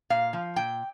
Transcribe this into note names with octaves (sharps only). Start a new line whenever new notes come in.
A#2 F5
F3
A#2 G5